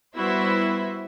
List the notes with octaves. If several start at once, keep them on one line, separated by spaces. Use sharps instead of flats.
G3 B3 E4 F#4 C5 E5